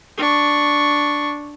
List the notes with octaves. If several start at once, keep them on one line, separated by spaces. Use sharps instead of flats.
D4 C#6